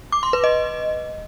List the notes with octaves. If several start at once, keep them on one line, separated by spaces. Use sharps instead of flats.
D6
C6
B4
D#5